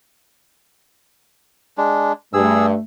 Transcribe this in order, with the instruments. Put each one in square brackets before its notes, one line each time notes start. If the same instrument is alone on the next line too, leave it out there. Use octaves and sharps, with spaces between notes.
[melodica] G#3 D4
[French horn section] G2 [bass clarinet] A3 [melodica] G#4 E6